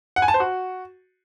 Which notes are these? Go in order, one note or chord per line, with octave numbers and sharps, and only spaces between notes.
F#5
G#5
A5
C5
F#4